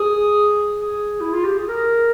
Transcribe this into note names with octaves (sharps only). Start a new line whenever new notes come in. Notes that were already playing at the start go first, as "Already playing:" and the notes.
Already playing: G#4
G#4
E4
F4
G4
G#4
A#4